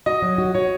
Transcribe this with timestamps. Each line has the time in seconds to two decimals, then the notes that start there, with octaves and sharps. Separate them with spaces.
0.06 F#4 D#5
0.22 F#3
0.38 F#4
0.54 F#4 C#5